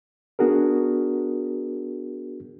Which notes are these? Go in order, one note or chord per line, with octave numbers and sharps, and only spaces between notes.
B3 D4 F#4 G#4 A#4